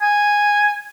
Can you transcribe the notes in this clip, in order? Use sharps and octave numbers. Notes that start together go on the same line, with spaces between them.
G#5